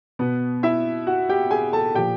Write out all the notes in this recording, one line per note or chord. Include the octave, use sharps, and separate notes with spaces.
B2 B3 B4
E4 E5
F#4 F#5
G4 G5
G#4 G#5
A4 A5
A#2 F3 G4 G5